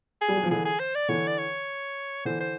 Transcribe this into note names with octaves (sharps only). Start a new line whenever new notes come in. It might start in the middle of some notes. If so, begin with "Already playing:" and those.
G#4
G3
F#3
F3
D3 E3 G#4
G#4
C5
D5
D3 E3 C#5
D5
C#5
D3 E3 C5
C5